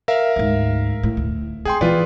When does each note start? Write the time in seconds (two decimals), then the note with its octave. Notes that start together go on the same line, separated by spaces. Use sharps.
0.08 A#4 E5 F5
0.36 D2 G#2
1.03 A2
1.17 D2
1.65 C4 G#4 G5 C6
1.81 E3 B3 F4 B4 D5